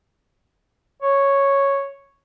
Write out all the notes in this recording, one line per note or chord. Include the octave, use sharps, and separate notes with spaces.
C#5